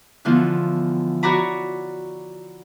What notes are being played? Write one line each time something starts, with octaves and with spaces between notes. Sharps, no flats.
D3 E3 F3 B3 F4
F#4 C#5 D5 A#5 B5